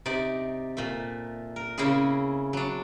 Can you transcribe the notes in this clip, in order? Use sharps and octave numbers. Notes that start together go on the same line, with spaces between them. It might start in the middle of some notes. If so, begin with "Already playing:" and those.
C3 D#4 D5
A#2 A3
A#4
C#3 A#3 C4 C#4 E4 G#4
F#3 D4